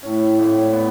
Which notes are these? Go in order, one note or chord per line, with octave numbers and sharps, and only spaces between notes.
A2 C#4
G#1
B3